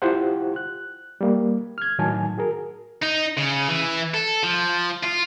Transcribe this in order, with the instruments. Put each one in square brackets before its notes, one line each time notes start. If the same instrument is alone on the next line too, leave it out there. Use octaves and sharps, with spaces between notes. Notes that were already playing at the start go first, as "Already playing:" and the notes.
[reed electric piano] E4 F4 G4 C5 F#5
F#6
G3 A#3
F6 G#6
A2 D#3 F#3 G#5 A5
F#4 G#4 A#4
[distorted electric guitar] D#4
C#3
E3
A4
F3
F4